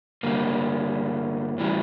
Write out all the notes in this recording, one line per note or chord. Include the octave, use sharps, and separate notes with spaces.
G2 D3 G3 A#3
A2 E3 G3